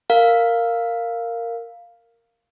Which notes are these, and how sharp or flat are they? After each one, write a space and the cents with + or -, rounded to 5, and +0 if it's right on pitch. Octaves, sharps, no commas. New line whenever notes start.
A#4 -10 F5 +0